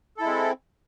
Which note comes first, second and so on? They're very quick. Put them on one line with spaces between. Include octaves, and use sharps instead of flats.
A4 E4 G#3 C4